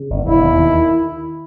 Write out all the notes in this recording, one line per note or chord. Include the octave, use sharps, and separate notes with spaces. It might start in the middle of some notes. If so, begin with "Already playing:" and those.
Already playing: C#3
G1
E1 E4
D#2
D#3